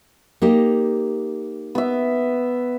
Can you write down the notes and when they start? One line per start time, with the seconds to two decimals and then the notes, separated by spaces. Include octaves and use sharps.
0.42 A#3 D#4 G4
1.75 B3 E5